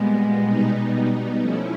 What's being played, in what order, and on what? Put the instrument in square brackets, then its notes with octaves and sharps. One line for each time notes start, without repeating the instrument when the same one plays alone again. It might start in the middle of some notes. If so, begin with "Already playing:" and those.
Already playing: [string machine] A#2 G3 B3 [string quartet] G#3
[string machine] B2 G3 B3 D#4
F3 A3 C#4 E4